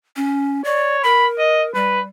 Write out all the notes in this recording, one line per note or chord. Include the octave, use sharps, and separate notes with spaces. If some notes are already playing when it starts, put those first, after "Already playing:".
C#4
C#5 D5
A#4 B5
D#5
G3 B4